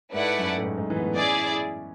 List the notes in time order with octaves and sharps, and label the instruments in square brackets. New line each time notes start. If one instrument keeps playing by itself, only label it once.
[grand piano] G#2 [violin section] A3 E4 B4 D5 F#5
[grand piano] F#2
A2
G#2
G#2
E3
B3
A3
[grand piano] C#4 [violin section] E4 G#4 D5